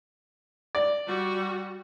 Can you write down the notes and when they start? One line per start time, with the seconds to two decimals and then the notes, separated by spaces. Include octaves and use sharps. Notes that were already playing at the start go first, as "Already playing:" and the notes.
0.75 D5
1.07 G3 F#4